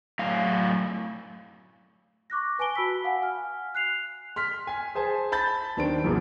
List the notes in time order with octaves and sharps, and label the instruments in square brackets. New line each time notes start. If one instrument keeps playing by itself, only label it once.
[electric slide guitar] F#2 A2 F5
[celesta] C#6 D6 F#6 A#6
B4 G#5 A5 D7 G7
F#4 B5 E6 B6
F5 F#5 G#5
G#5 F6
F#6 C7 F7
[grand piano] C6 F6 B6
G#5 C6 B6
G#4 C5 G#5 A5
A5 B5 G6 A6
D#2 D#3 D4 C5 D7
A#1 E2 A#2 C#3